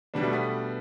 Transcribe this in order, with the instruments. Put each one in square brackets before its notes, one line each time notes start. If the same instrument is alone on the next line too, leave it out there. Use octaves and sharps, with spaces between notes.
[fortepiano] B2 B3 D4 [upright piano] G3
[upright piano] A3
B3